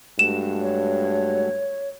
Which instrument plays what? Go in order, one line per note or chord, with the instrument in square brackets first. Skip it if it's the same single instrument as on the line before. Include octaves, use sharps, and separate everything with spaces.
[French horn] G2 [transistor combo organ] G#3 A3 F#4 [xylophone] E7
[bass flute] C#5